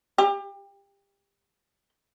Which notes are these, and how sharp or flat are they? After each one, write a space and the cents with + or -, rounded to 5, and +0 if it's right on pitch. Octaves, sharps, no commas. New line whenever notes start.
G4 +30